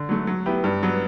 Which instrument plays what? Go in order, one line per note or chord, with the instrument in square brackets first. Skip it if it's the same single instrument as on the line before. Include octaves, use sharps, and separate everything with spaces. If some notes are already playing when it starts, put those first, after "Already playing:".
Already playing: [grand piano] D3
F#3 A3
F#3
B3 E4 G4
G2
F#3 B3